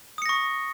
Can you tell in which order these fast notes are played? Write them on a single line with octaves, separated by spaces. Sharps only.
D#6 C#7 A#6 C#6